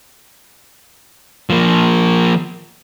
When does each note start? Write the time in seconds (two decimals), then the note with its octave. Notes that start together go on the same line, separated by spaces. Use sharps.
1.50 F3 A#3